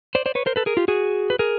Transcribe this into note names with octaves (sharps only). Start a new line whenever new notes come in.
C5 D5
C5 D5
B4 C#5
A#4 C5
A4 B4
G#4 A#4
F4 G4
F#4 G#4
B4
G#4 A#4